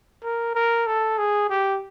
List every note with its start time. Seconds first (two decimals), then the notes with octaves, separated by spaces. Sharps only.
0.23 A#4
0.55 A#4
0.87 A4
1.18 G#4
1.50 G4